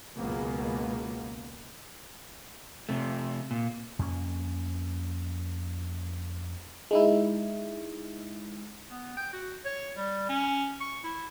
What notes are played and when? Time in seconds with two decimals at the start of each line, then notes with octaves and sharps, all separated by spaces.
0.17 C#2 F#2 B2 A#3 B3
2.89 C3 A3
3.51 A#2
3.99 F2 A#3 C#4
6.91 G#3 D#4 E4
8.90 B3
9.17 G5
9.33 F#4
9.65 C#5
9.96 G3
10.29 C#4
10.80 C#6
11.04 E4